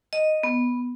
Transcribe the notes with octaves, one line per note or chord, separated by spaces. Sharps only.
D#5
B3